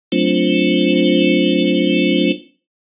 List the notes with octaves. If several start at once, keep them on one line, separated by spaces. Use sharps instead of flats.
F#3 A3 C4 D4 F4 C5